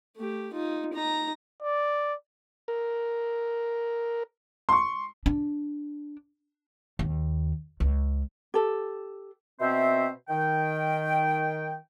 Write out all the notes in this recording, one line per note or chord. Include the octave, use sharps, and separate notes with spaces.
A3 G4
D#4 F4
D#4 A#5
D5
A#4
C6 C#6
D4
D#2
C#2
G4 A4
B2 C4 C5 E5
D#3 G5